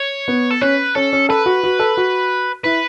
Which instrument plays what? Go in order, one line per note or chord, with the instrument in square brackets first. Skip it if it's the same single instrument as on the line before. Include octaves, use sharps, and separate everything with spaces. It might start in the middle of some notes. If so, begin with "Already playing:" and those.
Already playing: [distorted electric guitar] C#5
[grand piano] B3
[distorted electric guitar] A4
[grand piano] C#4 [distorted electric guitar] B4
[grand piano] C#4 [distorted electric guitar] A4
[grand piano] C#4
[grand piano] A4 [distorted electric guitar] B4
[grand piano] F#4
F#4
A4
F#4
[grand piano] E4 [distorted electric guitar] B4